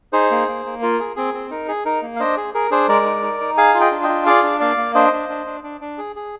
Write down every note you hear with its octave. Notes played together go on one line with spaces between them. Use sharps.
D#4 G#4 C5
A#3
A#3
A#3
F4 A#4
G#4
C4 G#4
C4
D#4 A#4
G#4
D#4 A#4
A#3
F5
D4 C5 D#5
G#4
G#4 A#4
D4 G#4 C5
G#3 A#4 D5
D#4
D#4
D#4
G#4 F5 G#5
F4
D#5 G5
D4
D#5 G5
F4
G#4 D5 F5
D4
A#3 D5 F5
A#3
D4 C5 D#5
D4
D4
D4
D4
D4
G#4
G#4